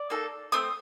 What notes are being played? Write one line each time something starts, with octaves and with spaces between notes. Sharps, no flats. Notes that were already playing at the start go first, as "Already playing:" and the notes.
Already playing: D5
A#3 D#4 A4
A3 C4 D#6